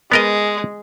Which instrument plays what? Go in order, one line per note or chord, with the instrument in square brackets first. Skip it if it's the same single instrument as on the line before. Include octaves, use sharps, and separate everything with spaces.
[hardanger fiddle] G#3 [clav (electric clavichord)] B3 A#4 D#5